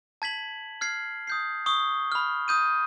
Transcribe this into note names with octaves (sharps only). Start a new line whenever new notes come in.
A5 G#6 B6 F#7
F6 G#6 C7
D#6 G6 C7
C#6 D#6 G7
B5 F6
D#6 G6 D#7